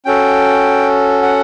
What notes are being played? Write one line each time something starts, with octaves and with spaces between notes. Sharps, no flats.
C#4 F#4 A4 G5
F#5